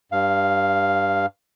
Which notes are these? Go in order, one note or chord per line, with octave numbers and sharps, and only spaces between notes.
G2 F5